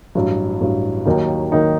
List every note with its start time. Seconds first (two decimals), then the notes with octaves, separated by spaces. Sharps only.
0.15 A1 G2 F#3
0.61 A1 G2 F#3
1.06 D#2 D#3 F#3 A#3 D#4
1.52 D#3 F#3 A#3 D#4